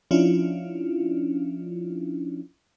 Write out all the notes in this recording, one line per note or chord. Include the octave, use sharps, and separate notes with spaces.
F3 C#4 D4 E4 F4